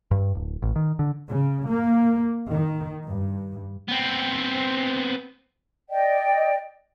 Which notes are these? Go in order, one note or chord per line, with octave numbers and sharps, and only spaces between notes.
G2
D1
A1
D#3
D3
C#3
A#3
D#3
G2
B3 C4
D5 D#5 G5